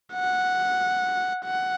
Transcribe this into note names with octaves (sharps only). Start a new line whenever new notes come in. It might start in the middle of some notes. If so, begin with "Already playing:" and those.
F#5
F#5